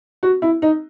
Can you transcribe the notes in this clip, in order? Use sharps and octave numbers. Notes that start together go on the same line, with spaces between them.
F#4
E4
D#4